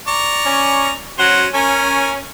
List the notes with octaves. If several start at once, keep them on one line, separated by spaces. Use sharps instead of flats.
D5 A#5 C#6
C#4
F#3 C#4 F#4 C5 F#5
C#4 A#4 G#5